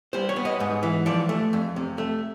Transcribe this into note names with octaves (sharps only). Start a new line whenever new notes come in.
G3 C5
C#5
B3
D#5
G#2
E3
F3 D5
A3
F2
C3
A3